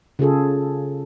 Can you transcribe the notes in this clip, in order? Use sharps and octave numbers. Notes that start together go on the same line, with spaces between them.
C#3 F4 G#4 A4